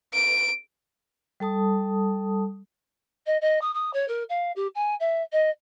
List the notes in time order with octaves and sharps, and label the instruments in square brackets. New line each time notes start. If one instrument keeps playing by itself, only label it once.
[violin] D7
[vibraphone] G3 A4 A5 D#6
[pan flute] D#5
D#5
D#6
D#6
C#5
A#4
F5
G4
G#5
E5
D#5